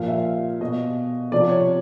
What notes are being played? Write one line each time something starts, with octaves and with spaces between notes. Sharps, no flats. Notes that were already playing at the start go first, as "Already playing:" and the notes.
Already playing: A#2 F3 F5
E5
B2 D#5
C3 F3 D5
C#5